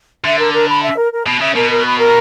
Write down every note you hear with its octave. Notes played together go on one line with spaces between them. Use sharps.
D3 E5
A#4
A#4
B5
E5
A#4
A#4
B2 B5
C#3 E5
B2 A#4
A#4
B5
A#4